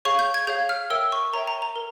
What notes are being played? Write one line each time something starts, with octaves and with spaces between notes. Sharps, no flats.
G#4 C#5 F5 C#6
G6
G#6
G#4 C#5 F5 G6
F6
A#4 C#5 E5 G5 E6
C#6
A#4 C#5 E5 G5 A#5
A#5
A#5
A#4